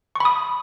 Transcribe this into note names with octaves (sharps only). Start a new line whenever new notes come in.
B5 C#6 D#6